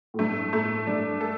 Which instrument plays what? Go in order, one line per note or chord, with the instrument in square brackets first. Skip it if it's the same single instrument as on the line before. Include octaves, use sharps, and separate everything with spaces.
[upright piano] A2
[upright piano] G2 [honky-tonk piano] A3
[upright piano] A2 [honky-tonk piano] A3
[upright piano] G2 [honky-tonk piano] D4
[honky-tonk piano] A4